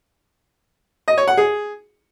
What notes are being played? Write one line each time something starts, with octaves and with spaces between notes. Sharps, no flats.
D#5
C#5
F#5
G#4